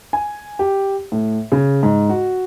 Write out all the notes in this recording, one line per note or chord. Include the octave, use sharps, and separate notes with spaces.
G#5
G4
A2
C#3
G#2
F#4